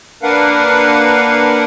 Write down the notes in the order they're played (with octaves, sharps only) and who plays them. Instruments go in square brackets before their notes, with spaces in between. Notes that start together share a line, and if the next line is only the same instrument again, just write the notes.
[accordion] A#3 D4 A#4 B4 F5 F#5